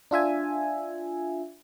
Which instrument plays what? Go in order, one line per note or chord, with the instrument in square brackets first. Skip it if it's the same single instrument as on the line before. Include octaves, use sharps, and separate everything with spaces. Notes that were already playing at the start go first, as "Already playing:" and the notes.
[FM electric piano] D4 F4 E5 G#5